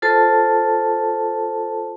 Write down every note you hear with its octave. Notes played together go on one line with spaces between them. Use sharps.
F4 A4 C5 A5